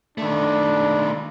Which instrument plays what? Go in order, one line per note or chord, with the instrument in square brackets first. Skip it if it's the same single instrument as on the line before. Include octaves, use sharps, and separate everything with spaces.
[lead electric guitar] D#3 A3 [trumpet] D4